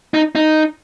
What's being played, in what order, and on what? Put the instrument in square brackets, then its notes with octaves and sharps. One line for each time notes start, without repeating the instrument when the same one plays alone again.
[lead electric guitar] D#4
D#4